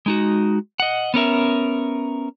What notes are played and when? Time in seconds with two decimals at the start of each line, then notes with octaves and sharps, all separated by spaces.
0.06 G#3 D#4 F#4
0.80 D#5 F#5
1.14 B3 C#4 A#4 E5